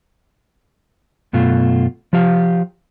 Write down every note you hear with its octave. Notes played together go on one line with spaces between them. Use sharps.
F#2 B2 A3 F4
F3 G4 F5